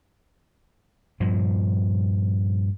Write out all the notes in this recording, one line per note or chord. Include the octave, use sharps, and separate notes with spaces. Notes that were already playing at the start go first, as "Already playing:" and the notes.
G2 A#2 F3